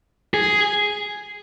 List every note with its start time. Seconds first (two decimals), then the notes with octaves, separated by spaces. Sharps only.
0.34 G#4